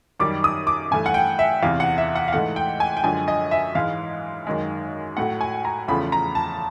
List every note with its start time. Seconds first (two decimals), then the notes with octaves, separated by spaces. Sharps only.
0.20 F#2 D#3 G3 D6
0.44 D#6
0.67 D6
0.91 G2 E3 A3 G#5
1.06 F#5
1.14 G5
1.39 E5
1.63 E2 C3 E3 F5
1.80 F#5
1.98 E5
2.16 F#5
2.28 F5
2.33 G#2 E3 A3 F#5
2.56 G5
2.80 G#5
2.97 G5
3.04 F#2 D3 F3 G#3 G#5
3.28 D#5
3.51 E5
3.75 G#2 E3 G#3 F5
4.47 F#2 D#3 G#3
5.17 A2 F#3 A3 F#5
5.41 G#5
5.65 A#5
5.88 E2 C#3 F3 A3 B5
6.12 A#5
6.35 A5